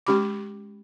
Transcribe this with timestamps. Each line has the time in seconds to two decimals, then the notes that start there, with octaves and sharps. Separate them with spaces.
0.07 G#3 C#4 G4 B5 D6